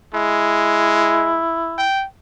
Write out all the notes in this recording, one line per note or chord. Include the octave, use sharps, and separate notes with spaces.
G#3 E4
G5